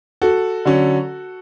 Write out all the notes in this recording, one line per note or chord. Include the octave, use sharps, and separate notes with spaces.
F#4 A4
D3 F#3 C#4